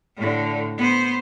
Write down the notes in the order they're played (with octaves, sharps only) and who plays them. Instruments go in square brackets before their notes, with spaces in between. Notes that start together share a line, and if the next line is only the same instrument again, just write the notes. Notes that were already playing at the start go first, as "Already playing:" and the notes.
[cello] A2 D3
B3 C5